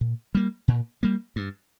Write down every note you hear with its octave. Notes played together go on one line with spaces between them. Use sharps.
A#2
G3 A#3
A#2
G3 A#3
G2